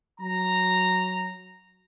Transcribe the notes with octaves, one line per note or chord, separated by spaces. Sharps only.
F#3 A#5